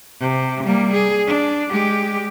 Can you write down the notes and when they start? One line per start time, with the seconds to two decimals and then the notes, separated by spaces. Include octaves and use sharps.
0.21 C3
0.64 G3 A#3
0.93 G#4
1.27 D4
1.71 G#3 G4